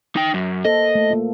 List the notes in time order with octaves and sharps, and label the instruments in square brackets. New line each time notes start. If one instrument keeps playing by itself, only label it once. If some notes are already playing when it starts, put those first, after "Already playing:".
[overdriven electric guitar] D#4 G5
F#2
[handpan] A#3 A4 C5 [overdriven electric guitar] D#5
[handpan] A3
A#3 F4